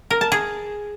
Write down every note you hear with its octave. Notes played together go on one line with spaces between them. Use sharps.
A#4
A5
G#4